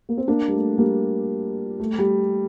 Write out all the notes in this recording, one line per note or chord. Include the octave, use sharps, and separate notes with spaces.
A#3
C4
A#3 D4
G3
A3
G3 A#3
A3
G3